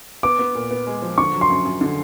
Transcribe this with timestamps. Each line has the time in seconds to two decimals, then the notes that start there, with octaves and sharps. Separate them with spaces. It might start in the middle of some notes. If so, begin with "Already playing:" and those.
0.23 B3 D6
0.39 B3
0.55 A#2
0.71 B3
0.87 G#3
1.02 F3
1.18 D3 C#6
1.34 F#3
1.41 C6
1.50 F#2
1.65 F#2
1.81 D3